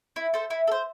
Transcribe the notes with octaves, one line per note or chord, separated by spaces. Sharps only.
E4
A4 C5
E4
A4
C5